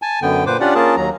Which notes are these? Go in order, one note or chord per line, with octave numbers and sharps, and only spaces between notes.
G#5 A5
F#2 D3 B3 G5
A#2 B4 C5 D6
C#4 D4 F4 G4 D5 F#5
A#3 C#4 F4 G#4 A#4 A5
D#2 F#3 A#5